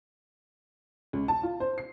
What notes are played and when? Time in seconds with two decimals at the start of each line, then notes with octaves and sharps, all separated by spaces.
1.13 C#2
1.28 A5
1.43 F4
1.60 C5
1.78 C7